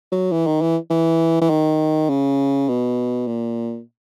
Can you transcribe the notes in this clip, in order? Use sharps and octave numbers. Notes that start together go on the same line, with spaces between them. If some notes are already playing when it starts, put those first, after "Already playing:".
F#3
E3
D#3
E3
E3
E3
D#3
C#3
B2
A#2